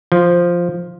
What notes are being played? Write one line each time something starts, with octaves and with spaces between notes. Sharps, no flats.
F3